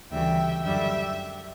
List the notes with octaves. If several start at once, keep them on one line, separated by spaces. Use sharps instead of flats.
D2 C#3 E3 G3 E5 G5
F#2 D3 G3 E5 G5